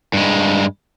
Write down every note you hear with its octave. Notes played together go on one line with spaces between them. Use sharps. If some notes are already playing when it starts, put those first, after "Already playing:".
G2 G#3